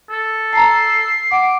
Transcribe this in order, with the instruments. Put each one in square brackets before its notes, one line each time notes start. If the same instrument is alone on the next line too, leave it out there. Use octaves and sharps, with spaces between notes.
[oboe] A4
[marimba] A5 A#5 [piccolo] C7
[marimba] F#5 [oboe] D6